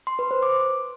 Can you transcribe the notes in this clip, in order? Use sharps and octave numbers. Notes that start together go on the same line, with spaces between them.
C6
B4
C5
D6